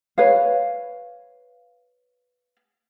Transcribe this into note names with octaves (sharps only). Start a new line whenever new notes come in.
B4 C#5 F5